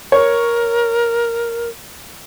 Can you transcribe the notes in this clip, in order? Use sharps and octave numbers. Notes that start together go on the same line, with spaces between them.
A#4 C#5